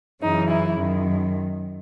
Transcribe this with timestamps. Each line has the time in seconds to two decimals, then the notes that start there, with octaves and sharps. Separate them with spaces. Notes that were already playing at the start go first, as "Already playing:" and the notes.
0.22 F#2 C#3 E3 D#4
0.50 E4
0.79 F#2 D#3